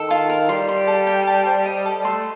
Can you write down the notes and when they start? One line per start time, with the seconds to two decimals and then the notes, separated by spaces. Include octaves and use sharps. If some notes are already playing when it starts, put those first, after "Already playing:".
Already playing: D#3 A4
0.10 F4
0.29 A#4
0.49 G3 C6
0.68 C6
0.87 A4
1.07 G5
1.27 A5
1.46 C5
1.65 D#5
1.85 A4
2.05 A3 C6